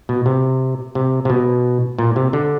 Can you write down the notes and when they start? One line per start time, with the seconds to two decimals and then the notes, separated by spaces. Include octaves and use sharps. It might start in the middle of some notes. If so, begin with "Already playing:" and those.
0.09 B2
0.26 C3
0.95 C3
1.25 C3
1.30 B2
1.99 A#2
2.16 C3
2.33 D3